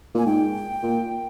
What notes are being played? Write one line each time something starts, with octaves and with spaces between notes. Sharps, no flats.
A#2 G#5
G#2 G5
A#2